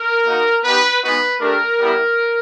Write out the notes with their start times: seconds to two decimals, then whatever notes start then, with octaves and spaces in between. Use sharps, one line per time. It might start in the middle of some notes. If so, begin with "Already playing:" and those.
Already playing: A#4
0.25 A#3 D#4 F#4
0.64 B3 D#4 G4 B4
1.01 G#3 B3 D#4 F#4 B4
1.40 A3 D4 G4 A#4
1.78 G3 B3 E4 G4